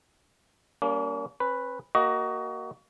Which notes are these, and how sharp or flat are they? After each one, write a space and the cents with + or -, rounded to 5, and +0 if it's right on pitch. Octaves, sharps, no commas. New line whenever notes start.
G3 +0 A#3 +0 C#4 +45
C#4 -45 B4 +0
A#3 +0 F#4 +25 D#5 +0